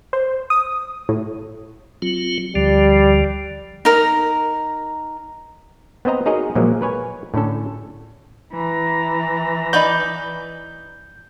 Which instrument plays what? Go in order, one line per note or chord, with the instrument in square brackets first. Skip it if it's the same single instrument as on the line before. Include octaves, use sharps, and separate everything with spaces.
[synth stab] C5
D#6
A2
[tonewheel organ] F#3 C4 F4
[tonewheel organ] D2 D3 F3 [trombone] G3
[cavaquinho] D#4 A#4
[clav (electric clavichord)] B3 C4 C5 D#5 A#5
D#4 F#4 G#4 A#4 C#5 D#5
A#2 F3 F#3 G#3 A#3
A#4 B4 C#5 G#5
A2 D3 C#4 A4
[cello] E3 [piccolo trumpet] A#5
[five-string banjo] D#4 B4 D5 [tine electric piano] G6